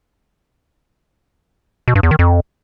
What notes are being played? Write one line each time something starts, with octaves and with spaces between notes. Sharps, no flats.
B2
G2
E2
D#3
F2